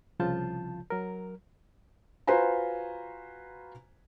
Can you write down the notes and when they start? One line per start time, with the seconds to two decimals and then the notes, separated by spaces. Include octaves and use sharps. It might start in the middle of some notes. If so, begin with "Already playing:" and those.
0.19 C2 C#3 F3 F4 A5 G6
0.90 F#3 A#4
2.27 F4 F#4 B4 C5 G#5 A#5